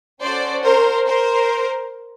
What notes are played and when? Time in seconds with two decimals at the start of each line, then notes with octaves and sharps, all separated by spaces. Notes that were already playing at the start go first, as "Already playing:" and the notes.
0.21 C#4 F#4 A4 C5 D5
0.64 A#4 C5
1.07 A#4 C5